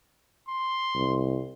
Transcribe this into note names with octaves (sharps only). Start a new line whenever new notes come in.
C6
C2